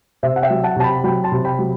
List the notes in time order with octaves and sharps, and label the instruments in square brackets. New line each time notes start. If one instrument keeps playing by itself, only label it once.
[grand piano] C3 C5 E5
F#5
E5 G5
F#3
F#5 A5
C3 A5
G5 B5
F#3 G5 B5
A5 C6
C3
G5 B5
F#3